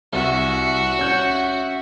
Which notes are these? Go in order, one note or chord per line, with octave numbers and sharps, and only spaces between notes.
C2 F#4 E5
C#4 G6